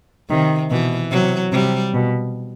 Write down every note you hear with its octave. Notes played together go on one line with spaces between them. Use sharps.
C3 D#3
B2 E3
C3 F#3
C3 G3
B2